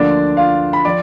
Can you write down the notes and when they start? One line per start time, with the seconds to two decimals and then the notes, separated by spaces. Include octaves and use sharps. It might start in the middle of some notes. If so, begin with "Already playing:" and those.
Already playing: D2 D3 F3 A#3 D4 D5
0.37 F4 F5
0.73 B5
0.85 F3 D5 D6